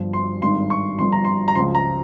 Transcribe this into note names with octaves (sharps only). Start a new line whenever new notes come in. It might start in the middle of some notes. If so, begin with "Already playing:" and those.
Already playing: G1 G2 F3
C6
G#1 G2 D#3 C6
C#6
G1 G2 F3 C6
A#5
C6
A#5
C#2 C#3 F3 C6
A#5